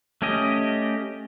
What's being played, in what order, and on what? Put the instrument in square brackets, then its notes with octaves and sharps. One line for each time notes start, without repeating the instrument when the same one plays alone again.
[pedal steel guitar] A3 C#4 G4 D#5